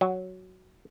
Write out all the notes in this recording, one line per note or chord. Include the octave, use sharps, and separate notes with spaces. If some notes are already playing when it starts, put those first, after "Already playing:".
F#3